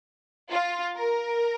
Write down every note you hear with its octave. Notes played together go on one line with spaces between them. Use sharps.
F4
A#4